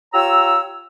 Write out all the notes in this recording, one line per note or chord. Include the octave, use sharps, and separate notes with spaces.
F4 G4 C#5 A#5 E6